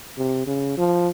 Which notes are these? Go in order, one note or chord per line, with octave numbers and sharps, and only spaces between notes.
C3
C#3
F3